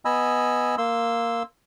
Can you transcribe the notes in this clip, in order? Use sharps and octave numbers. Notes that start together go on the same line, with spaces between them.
B3 D#5 G#5 B5 E6
A#3 C6 E6